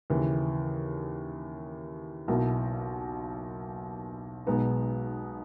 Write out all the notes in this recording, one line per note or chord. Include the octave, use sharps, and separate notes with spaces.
D#2 C#3 E3
B1 B2 A#3 E4
B1 B2 G#3 B3 D#4